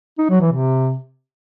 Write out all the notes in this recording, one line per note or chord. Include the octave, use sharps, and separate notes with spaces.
D#4
F#3
E3
C3